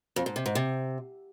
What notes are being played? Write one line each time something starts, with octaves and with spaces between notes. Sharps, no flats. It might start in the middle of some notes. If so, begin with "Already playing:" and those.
F2
G#2
C3
G#2
C3